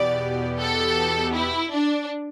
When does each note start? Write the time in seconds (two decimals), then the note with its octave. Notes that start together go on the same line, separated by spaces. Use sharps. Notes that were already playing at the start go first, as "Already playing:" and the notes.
Already playing: E2 B2 B3 G4 D5
0.60 A4
1.35 E4
1.72 D4